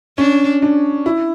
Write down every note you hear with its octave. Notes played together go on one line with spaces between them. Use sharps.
C#4 D4
D4
E4